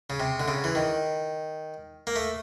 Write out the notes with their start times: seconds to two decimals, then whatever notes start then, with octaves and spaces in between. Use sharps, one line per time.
0.10 C#3
0.20 C3
0.40 D3
0.48 C#3
0.64 E3
0.75 D#3
2.07 A#3
2.16 A3